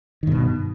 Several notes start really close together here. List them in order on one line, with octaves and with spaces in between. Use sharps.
D#3 G2 B2